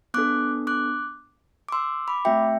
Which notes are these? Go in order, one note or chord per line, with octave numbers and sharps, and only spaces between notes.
B3 D4 A4 D6 F#6
D6 F#6
D6
C6 E6
B5 D6
A3 C4 F#4 E5 G5